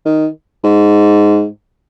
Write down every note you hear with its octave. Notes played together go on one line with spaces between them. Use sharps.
D#3
G#2